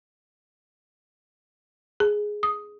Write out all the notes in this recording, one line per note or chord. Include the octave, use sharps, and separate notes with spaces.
G#4
D#6